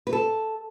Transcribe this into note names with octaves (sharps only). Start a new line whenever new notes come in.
B4
A4